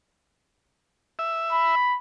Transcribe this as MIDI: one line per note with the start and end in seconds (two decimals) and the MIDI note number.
1.19 1.75 76
1.52 1.98 83